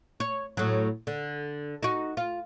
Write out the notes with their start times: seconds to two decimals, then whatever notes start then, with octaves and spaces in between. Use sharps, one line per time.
0.20 C#5
0.57 A2 F#3
1.07 D3
1.83 D#4 F#4
2.17 F4